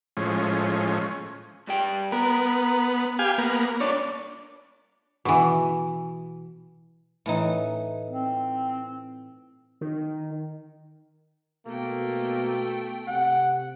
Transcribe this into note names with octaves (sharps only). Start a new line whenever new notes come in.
A2 F3 G#3 C#4
G2 G3 G5
B3 A#4
G4 F5 G#5
A#3 B3
C2 A#2 D4 C#5
B2 E3
A2 E3 D#4
C4
D#3
B2 A3 A#3 G5
C3 F#5